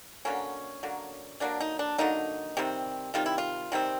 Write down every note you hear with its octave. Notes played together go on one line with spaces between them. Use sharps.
D3 F#3 A#3 C#4
D3 F#3 A#3
D3 F#3 A#3 D4
D#4
D4
D3 F#3 A#3 D#4
C3 D#3 G3 C4
C3 D#3 G3 C4 F4
E4
F4
C3 D#3 G3 C4